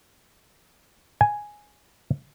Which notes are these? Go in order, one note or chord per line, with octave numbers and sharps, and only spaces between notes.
G#5